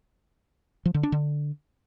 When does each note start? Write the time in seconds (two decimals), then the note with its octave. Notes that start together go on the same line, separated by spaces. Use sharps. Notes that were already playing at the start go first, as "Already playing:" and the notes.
0.86 F3
0.94 D3
1.03 D4
1.12 D3